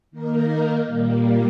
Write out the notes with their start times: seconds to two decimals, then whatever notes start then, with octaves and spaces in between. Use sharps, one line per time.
0.11 D#3 A#3 D#4 A#4
0.85 A#2 G3 A#3